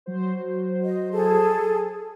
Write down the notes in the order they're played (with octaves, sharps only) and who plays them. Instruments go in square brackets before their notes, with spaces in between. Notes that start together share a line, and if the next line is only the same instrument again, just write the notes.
[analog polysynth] F#3 F#4 C5
[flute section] D#5
G#4 A4